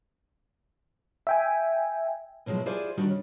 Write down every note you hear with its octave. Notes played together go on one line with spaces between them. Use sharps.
E5 G5 G#5
B2 F3 F#3 G#3 E4
E4 F4 G4 G#4 C5 D5
D#3 G3 D4 F#4
C#3